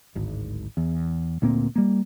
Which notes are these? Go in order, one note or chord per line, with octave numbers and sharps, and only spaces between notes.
D1 G#1
E2
D2 A#2 A#3 C4
G3 A#3